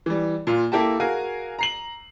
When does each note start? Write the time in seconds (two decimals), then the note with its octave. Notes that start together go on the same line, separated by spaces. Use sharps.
0.06 E3 G3
0.47 A#2 F4
0.72 A#3 E4 G4 A4 A5
1.00 F#4 G#4 A#4 F5 G#5
1.59 A#5 C7 F#7